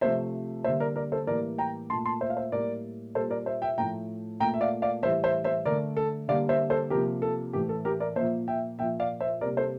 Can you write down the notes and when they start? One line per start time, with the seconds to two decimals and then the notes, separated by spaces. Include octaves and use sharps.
0.01 C3 F3 A3 C5 E5
0.64 D3 G3 A#3 C5 E5
0.80 A#4 D5
0.96 A#4 D5
1.12 A4 C5
1.27 A2 E3 G3 A#3 A#4 D5
1.58 G5 A#5
1.90 A#2 A3 A5 C6
2.06 A5 C6
2.21 C5 E5
2.30 F5
2.37 C5 E5
2.52 A2 G3 A#3 A#4 D5
3.15 A#2 G3 A#3 A4 C5
3.30 A#4 D5
3.46 C5 E5
3.62 E5 G5
3.78 A2 F3 A3 G5 A#5
4.40 A#2 A3 G5 A#5
4.54 E5
4.61 D5 F5
4.82 D5 F5
5.03 A2 E3 G3 C5 E5
5.24 C5 E5
5.44 C5 E5
5.65 D3 A3 A#4 D5
5.97 A4
6.28 D3 G3 A#3 D5 F5
6.49 C5 E5
6.70 A4 C5
6.90 C3 F3 A#3 G4 A#4
7.22 A4
7.53 A2 E3 A3 G4
7.69 A4
7.85 G4 A#4
8.00 A#4 D5
8.16 A#2 F3 A#3 C5 E5
8.48 E5 G5
8.79 A#2 F3 A#3 E5 G5
9.00 D5 F5
9.20 C5 E5
9.41 C3 G3 A#3 A#4 D5
9.57 A4 C5